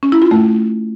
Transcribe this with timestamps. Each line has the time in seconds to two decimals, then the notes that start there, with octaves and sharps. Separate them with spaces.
0.03 C#4
0.12 E4
0.22 F4
0.31 A3